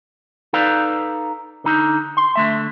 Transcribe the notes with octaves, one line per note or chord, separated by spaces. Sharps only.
D#4 A4 B4 D5 F5
D3 D#4
C6
D3 A3 E5